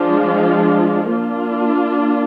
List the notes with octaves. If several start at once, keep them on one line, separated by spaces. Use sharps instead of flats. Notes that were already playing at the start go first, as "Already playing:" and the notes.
Already playing: F3 G#3 D4 F4
A#3 D4 F4